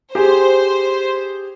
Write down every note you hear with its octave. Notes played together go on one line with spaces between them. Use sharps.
G4 G#4 C5